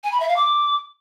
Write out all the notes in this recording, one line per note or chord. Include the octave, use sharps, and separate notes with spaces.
G#5
B5
E5
F5
D6